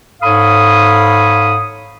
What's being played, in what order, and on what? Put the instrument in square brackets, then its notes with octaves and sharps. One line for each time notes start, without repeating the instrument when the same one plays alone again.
[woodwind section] G#2 A4 C#5 F5 B5 D#6